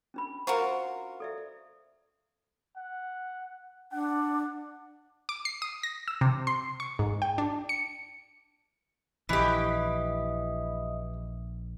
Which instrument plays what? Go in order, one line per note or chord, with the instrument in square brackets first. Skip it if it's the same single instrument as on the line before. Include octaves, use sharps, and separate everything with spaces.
[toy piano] C#4 D4 B5
[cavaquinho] F4 F#4 A#4 [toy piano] C5 A#5 C#6
[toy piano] A4 D5 E5
[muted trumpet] F#5
[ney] D4 [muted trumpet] F#5
[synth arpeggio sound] D6
C7
D#6
A#6
E6
C3
C6
C#6
G#2
G5
D4
C#7
[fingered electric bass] A#1 [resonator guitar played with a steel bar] E3 G4 [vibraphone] D#5 E5 D#6